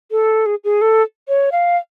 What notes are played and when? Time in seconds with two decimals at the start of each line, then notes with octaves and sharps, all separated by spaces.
0.11 A4
0.46 G#4
0.64 G#4
0.81 A4
1.28 C#5
1.52 F5